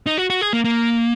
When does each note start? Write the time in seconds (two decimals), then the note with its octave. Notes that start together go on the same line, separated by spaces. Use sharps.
0.06 D#4
0.18 F#4
0.30 F#4
0.41 G#4
0.53 A#3
0.64 A#3